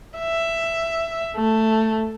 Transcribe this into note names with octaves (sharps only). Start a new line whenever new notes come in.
E5
A3